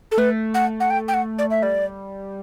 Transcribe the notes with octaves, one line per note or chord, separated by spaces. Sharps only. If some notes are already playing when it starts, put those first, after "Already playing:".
A4
A3 B4
F#5
F#5
G5
G5
F#5
D5
E5
G3 D5